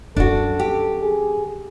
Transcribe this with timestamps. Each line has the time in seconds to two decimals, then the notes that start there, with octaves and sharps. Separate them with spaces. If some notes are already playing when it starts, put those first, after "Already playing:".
0.16 F#2 D3 D4 F#4 A4
0.59 G4
1.02 G#4